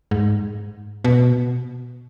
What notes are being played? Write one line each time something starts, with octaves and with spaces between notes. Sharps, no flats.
G#2
B2